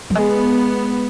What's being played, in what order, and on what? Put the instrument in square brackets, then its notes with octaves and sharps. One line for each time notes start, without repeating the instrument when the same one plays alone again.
[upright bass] F#3
[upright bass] G#3 [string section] B3